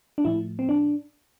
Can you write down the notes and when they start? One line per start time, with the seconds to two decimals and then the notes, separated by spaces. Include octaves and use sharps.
0.18 D4
0.25 A2 F3 A3 E4
0.59 C4
0.69 D4